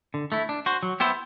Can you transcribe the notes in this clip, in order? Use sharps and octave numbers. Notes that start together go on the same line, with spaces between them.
D3
A3 E4
D4
F#4 C5
F#3
B3 E4 G4 C5